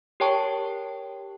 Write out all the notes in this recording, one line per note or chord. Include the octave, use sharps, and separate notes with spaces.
G4 A#4 C#5 G5 A5 C#6